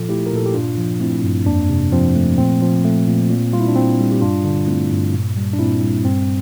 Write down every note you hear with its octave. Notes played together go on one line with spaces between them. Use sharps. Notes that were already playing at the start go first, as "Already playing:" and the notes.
Already playing: A#2 F3 F4 A4
A3 E4 G4
A#4
A#2 A4
G4
G2 D4 F4
F3
A3 C4 E4
G2
F2 A#3 D4
C3
F3 C4
A3
A#2 C4
F3
A3
A#2
A#2
G3 F4
E4
D4
A#2 C4
G3
G4
G2 D4 F4
D3 D4 F4
A3 C4 E4
G2
A#2
G3
D4
A#2 C4 E4
G3
G2 C4